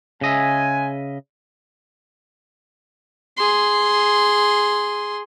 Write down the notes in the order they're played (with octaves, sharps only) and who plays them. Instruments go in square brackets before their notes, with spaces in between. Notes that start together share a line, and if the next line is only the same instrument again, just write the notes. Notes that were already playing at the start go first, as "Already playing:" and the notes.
[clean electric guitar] C#3 D#5 E5 [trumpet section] G#3 G#5
[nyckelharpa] G#4 C6